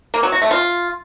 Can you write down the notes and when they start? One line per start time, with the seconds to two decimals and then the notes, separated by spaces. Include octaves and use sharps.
0.14 A#3
0.23 F#3
0.32 F#4
0.42 A3
0.51 F4